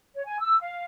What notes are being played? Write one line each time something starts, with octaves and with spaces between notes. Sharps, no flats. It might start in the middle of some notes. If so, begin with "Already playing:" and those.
C#5
G#5
E6
F5